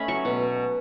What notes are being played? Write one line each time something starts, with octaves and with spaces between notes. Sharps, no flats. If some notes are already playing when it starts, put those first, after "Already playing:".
Already playing: A3 C#4 D#5 B5
F#3 C#6
B2